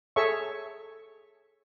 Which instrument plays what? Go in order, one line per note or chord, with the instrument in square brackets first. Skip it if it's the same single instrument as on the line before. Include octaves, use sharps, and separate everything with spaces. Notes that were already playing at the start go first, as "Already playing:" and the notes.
[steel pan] G#4 A4 C#5 E5 C#6